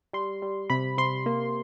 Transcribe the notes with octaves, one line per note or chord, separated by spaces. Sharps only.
G3 C6
G3
C3 B5
C3 C6
A#3